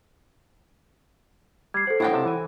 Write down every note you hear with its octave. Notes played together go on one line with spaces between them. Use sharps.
G3 G#6 C7
A4 C5 F#5
A2 C#4 D4 E4 F#5 G5
C#2 C3 A5
E3 G#5